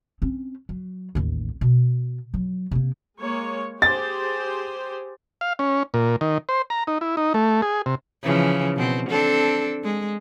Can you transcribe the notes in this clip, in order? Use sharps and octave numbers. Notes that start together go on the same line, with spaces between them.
C4 C#4
F#3
A1 D#2
B2
F#3
C3 A#3
G#3 A#3 C#5
G4 G#4 C5 A6
F5
C#4
A#2
D#3
C5
A#5
D#4
E4
D#4
A3
G#4
C3
C#3 E3 F3
B2 C4
C4 D4 A4
G#3